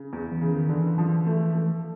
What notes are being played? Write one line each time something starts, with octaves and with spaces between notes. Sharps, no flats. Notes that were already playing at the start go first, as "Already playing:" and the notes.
Already playing: C#3
E2
E3
C#3
D#3
D3 E3
F3
A3
A3